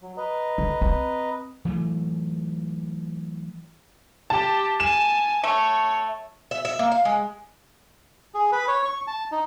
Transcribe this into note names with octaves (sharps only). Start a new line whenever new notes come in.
F#3
B4 D#5 A#5
D3
C4
E3 F#3 A3
G4 A5
G#5 A5 E7
A3 C#5
E5
E5
A#3
F5
G#3
G#4
B4
C#5
C#6
A5
D#4